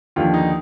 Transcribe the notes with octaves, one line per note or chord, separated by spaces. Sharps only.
D#2 D3 F3 F4
D#4